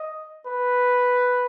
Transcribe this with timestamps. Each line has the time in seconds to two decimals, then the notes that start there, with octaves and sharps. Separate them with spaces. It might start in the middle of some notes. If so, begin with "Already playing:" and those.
Already playing: D#5
0.46 B4